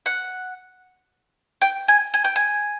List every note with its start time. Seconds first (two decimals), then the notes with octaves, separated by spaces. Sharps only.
0.06 F#5
1.62 G5
1.88 G#5
2.14 G#5
2.25 G5
2.36 G#5